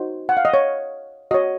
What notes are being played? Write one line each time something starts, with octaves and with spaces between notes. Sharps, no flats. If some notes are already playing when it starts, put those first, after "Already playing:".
Already playing: D#4 F#4 C5
F#5
F5
D#5
C#5
F#4 C#5 D#5